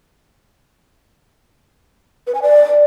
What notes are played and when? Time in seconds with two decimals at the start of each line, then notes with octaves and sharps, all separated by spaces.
2.27 B4
2.35 G#5
2.42 D5